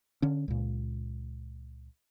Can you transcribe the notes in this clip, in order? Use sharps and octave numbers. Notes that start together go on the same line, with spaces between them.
D3 C#4
C#2 A#2